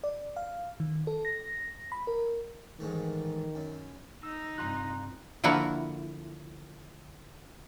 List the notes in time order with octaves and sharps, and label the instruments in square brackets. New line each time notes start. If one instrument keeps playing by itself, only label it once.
[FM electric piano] D5
F5
D#3
A4
A#6
B5
A#4
[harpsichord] A1 G#2 A3 [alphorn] D#3
[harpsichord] F#2
[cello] D#4 [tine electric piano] E6
[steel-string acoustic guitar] G2 C3 F4 [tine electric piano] A#5 C6 F#6
[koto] D3 F3 A#3 E4 F#4